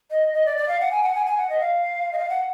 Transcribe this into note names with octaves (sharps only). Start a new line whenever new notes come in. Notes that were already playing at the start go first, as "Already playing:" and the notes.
D#5
D#5
D5
D5
F5
F#5
G#5
F#5
G#5
G#5
F#5
D#5
F5
D#5
F5
F#5